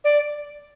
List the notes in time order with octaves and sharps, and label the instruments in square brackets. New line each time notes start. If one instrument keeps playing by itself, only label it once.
[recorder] D5